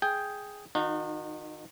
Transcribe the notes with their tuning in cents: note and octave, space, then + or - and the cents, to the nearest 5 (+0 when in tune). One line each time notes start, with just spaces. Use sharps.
G#4 +0 G5 +0
D#3 +0 D#4 -30 F#4 -40